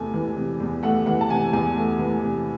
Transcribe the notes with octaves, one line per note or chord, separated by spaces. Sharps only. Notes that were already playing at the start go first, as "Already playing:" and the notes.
Already playing: E2 C3 A3 G#5 A5
E3
C3
E2
A3 F#5
E3 F#5
A5
C3 G#5
E2 G#5
A3
E3
C3